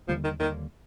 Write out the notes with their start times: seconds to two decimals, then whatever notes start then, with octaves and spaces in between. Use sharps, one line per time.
0.08 D#2 D3 F3 G3 A#3
0.24 D#3
0.40 D#2 D3 D#3 G3 A#3